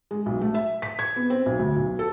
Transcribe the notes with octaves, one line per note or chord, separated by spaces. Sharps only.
G#3
B1
A3
E5
B6
G#6
B3
C4
B1
D2
B1
A4